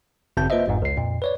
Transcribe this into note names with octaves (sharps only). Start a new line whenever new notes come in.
G#1 F#2 C#3 C4 A5 G6
A#3 F4 B4 C5 D#5 E5
G1 F2 G#2
C#2 C7
F2 A#2
B4 C#5 D5